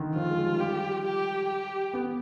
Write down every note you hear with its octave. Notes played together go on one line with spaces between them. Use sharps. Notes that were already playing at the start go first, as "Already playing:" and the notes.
Already playing: D3 D#3
F3 F4
G#3
G3
G3 G4
G4
G4
B3